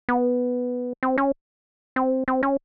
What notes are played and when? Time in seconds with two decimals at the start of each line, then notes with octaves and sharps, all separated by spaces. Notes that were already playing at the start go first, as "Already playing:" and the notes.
0.09 B3
1.03 C4
1.18 C#4
1.96 C4
2.28 C4
2.43 C#4